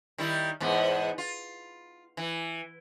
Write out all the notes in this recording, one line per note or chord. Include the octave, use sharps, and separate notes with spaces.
D#3 G3 E4
E2 G#2 B3
F4
E3